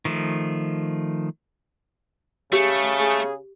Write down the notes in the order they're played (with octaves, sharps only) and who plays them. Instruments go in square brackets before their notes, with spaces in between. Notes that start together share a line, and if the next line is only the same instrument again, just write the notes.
[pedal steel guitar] D#3 F3 A3
[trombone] C#3 [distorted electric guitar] A3 [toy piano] G4 [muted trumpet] G#4
[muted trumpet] G#4